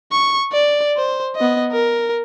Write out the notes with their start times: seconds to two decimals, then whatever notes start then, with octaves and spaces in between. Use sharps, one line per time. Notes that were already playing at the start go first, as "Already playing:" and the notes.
0.12 C#6
0.53 D5
0.97 C5
1.36 B3 D#5
1.72 A#4